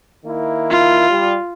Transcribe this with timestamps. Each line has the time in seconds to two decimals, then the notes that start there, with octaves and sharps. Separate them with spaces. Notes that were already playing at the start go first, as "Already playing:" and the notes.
0.25 D#3 A#3 E4
0.71 F4
1.09 G3